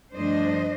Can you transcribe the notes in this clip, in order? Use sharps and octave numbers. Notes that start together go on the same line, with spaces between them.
G2 F3 A3 D4 C5 D#5